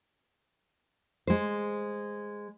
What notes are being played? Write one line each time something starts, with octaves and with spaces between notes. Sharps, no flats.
G#3 C5